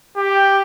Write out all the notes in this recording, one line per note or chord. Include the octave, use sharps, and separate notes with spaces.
G4